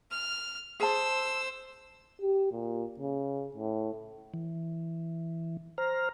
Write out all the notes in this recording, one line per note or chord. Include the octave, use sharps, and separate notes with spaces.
F6
G#4 C5 A5 E6
G4
A#2
C#3
A2
E3
C5 A#5 F6